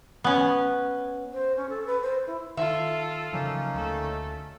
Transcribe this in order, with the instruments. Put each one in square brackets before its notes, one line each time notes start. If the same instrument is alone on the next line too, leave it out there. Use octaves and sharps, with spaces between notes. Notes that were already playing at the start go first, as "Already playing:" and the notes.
[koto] B3 C#4
[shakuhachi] C5
C#4
A4
B4
C5
E4
[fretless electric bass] D#3 [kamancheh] F4 A4 [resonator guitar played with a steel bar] E5
[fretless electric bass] C#3 F3 F#3 [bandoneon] A#3 C#4 D#4
[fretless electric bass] D2 [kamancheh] A3 A4